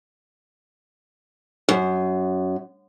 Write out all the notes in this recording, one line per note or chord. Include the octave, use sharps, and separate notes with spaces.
F#2